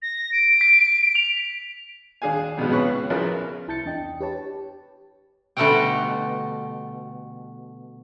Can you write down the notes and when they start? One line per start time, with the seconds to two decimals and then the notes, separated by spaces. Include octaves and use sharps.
0.02 A#6
0.32 D7
0.61 B6
1.15 F7
2.22 D#2 D4 G#4 F5 G#5
2.58 F2 B2 D#3 G#3 B3
2.70 C#2 B2 B3 B4 C#6
3.10 A#1 C#3 E4 F4 A#4 B4
3.68 C2 E4 A5 G6 A6 C#7
3.85 E2 D4 D#5 G5
4.20 G4 B4 C#5 A5
5.57 B2 D3 G3 A3 F#5 G5